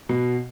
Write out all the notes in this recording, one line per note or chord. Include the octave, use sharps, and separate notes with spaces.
B2